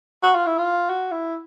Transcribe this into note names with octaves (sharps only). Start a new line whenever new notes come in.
F#4
F4
E4
F4
F#4
E4